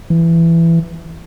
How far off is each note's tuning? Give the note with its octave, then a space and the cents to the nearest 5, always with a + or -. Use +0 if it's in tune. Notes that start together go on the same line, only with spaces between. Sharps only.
E3 +15